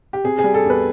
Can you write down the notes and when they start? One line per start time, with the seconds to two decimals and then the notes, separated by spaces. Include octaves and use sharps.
0.13 G4
0.24 C3 G#4
0.39 G#4
0.44 G3
0.54 A4
0.65 E2 B4